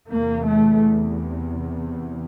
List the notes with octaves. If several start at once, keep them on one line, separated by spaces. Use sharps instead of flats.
E2 C3 A#3
A3